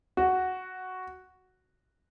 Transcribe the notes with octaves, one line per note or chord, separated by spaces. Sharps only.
F#4